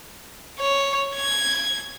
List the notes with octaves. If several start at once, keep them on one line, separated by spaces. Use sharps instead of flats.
C#5
G#6